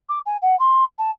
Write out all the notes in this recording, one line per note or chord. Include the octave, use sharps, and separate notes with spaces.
D6
G#5
F#5
C6
A5